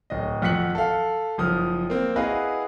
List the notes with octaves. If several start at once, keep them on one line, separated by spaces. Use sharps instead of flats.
D1 D#5
F2 F#4 F#6 B6 C#7 F#7
A4 F5
F#1 F3 D#6 F6
A#3 C4
E4 F#4 G#4 B4 D#5 F5